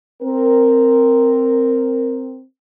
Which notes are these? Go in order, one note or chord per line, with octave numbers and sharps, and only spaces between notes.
C4 A#4